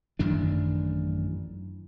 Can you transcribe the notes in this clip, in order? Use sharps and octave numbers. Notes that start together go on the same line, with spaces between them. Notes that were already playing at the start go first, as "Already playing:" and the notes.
A1 F#2 D#3 D4